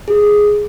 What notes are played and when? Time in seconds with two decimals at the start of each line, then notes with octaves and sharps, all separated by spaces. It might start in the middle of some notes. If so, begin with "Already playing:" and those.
0.08 G#4